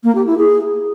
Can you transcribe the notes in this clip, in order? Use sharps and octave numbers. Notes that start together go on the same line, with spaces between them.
A#3
G4
E4
G#4